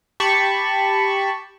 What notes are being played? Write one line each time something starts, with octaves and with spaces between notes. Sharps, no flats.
G4 A5 B5 C#6